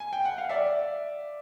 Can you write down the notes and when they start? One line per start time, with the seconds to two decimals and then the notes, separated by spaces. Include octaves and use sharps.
0.00 G#5
0.13 G5
0.25 F#5
0.38 F5
0.49 D5 E5